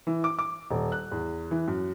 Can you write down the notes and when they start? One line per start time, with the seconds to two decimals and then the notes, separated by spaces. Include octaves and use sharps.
0.07 E3
0.24 D6
0.39 D6
0.71 D#1
0.92 F#6
1.12 E2
1.51 E3
1.68 F#2